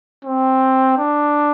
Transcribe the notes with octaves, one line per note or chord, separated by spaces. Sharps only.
C4
D4